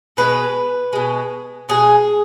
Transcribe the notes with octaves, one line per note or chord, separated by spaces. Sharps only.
B2 G#3 B4
B2 G#3
B2 G#3 G#4